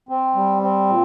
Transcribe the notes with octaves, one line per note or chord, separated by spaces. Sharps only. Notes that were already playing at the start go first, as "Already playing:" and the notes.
C4
G3
C4
A#2